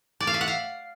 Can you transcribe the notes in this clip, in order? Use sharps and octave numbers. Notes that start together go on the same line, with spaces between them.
D5
F5
E5
F#5
F5